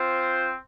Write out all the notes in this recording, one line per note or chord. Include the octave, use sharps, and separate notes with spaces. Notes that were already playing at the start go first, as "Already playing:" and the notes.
Already playing: C4 F4 C5